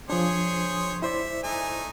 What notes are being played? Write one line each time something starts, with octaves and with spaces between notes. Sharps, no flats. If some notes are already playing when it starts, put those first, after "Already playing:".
F3 D4 G#4 C5 C#5
E4 C5 D5 E5
A3 D#4 G#5